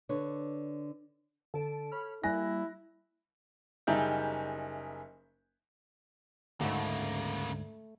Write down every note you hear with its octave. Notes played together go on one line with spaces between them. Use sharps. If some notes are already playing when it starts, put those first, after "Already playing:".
D3 D4 B4 C#5
D3 A4 A5 D7
C#5 B5 F6
G3 A#3 E4 G#5 F#6 A#6
F#1 G3 D#4 G#4 E5 G6
D2 G#2 C#3 A3 A#3